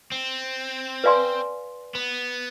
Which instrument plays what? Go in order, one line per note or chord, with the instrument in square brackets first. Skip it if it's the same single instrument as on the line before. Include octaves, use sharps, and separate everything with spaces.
[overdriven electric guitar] C4
[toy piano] B4 D5 F5 G#5 C6
[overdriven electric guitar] B3